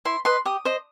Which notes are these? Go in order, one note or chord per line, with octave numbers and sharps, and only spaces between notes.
E4 C6
B4 D#5 C6
G4 D#6
C5 D#5